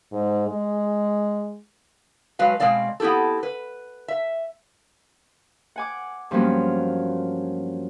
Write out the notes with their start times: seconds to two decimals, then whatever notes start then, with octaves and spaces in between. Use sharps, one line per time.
0.12 G#2
0.49 G#3
2.39 F#3 G#3 B4 F5
2.60 B2 G#3 C4 D5 F5
3.00 B3 C4 E4 G4 A4
3.43 B4
4.08 E5
5.76 F#5 G#5 D6
6.31 G2 F3 F#3 A#3 B3 C#4